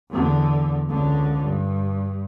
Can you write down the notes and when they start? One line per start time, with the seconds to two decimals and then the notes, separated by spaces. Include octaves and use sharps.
0.10 E2 D3
0.89 C#2 D3
1.45 G2